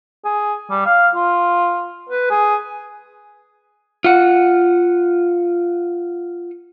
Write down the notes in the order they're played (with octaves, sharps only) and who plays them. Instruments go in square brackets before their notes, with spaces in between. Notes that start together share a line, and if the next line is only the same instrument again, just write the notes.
[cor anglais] G#4
G3
F5
F4
B4
G#4
[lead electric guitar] F4 F#5